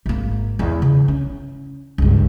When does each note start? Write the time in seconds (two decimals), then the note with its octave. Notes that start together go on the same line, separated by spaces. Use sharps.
0.06 G#1 A#3
0.59 E2
0.82 C#3
1.08 C#4
1.98 C#2 G2